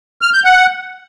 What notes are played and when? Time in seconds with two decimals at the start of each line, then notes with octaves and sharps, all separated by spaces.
0.22 F6
0.33 G6
0.45 F#5